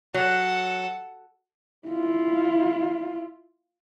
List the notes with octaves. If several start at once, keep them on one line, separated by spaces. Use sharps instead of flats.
F#3 A4 F#5
E4 F4